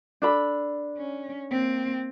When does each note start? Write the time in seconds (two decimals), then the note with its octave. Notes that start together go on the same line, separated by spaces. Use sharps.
0.22 D4 A4 B5
0.98 C#4
1.51 A#3 C4